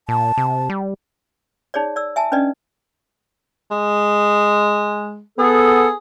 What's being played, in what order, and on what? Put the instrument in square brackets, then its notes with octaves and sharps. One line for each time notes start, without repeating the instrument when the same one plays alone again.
[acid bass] A#2 [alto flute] A5
[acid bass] C3
G3
[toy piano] D#4 G#4 C#5 D5
D5 E6
E5 G#5 A5
C#4 D4 B4 D5 D#5
[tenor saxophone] G#3
[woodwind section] B3 A4 [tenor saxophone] G#4